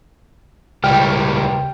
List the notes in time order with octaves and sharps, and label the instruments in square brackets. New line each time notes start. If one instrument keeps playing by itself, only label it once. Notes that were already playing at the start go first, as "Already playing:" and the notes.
[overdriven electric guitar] C#2 G3 [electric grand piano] G5 F6